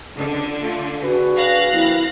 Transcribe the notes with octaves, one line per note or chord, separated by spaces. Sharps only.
C#2 D3 D4
A3 F4
D4 F#4 G#4 B4
F5 F#6 A#6
F3 A#3 C4 E4